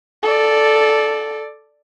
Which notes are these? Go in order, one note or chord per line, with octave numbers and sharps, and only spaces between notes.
A4 D5